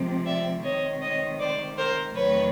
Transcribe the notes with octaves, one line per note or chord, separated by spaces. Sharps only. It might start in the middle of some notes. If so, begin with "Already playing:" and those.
Already playing: C3 F3 G#3 C4
D5 E5
C3 D#3 G#3 C4 C#5 D#5
C#5 D#5
C5 D5
A#4 C5
E2 C3 D#3 F#3 A3 B4 C#5